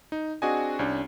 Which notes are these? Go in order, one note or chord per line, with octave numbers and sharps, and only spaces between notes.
D#4
C4 D4 F#4 G#4 D#5 G#5
C2 C#4 D4